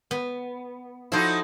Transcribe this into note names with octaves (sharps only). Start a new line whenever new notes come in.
B3
F3 D#4 E4 F#4 A4 C5